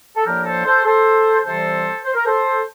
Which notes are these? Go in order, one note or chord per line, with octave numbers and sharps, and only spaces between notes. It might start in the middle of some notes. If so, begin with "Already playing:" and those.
A4
A2 F3 A#3 D4 G4 A#4
A4 C5
A4 C5
A4 C5
C3 E3 G3 C4 A4 C5
C5
A#4
A4 C5